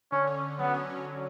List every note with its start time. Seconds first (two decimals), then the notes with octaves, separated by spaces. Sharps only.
0.12 D3 C#4
0.27 C#4
0.43 D3
0.59 F#3 B3
0.74 C#4
0.90 C#4
1.06 C#4